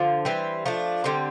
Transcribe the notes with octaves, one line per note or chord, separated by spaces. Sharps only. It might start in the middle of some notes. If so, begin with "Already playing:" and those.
Already playing: D3 F3
E3 G3 C4
F3 A3 D4
D3 G3 C4